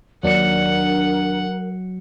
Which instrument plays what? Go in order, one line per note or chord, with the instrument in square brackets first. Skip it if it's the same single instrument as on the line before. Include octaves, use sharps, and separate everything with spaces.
[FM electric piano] D#2 D4 [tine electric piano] F#3 C#7 [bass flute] A#4 [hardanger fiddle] F#5